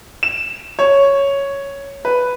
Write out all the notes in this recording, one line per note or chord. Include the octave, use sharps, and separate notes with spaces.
E7
C#5
B4